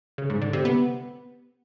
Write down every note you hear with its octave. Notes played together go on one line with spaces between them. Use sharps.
C#3
G#2
D3
C3
B3